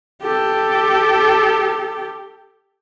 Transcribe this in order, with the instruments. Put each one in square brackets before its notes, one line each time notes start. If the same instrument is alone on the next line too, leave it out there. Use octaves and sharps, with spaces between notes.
[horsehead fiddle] G4 A4